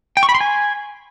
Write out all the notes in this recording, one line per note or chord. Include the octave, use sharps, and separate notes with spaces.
G5
C#6
B5
C6
G#5